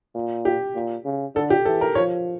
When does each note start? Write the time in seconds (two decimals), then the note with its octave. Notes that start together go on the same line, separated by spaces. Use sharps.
0.15 A#2
0.45 G4
0.75 A#2
1.05 C#3
1.36 D3 A4
1.50 G4
1.65 E3 A4
1.81 A#4
1.95 F3 C#5